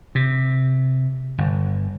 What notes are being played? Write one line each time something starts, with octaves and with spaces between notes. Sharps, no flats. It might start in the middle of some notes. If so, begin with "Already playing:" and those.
C3
G1